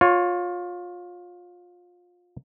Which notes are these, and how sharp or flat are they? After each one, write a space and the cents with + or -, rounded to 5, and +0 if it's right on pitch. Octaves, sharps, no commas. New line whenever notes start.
F4 +25 C#5 +0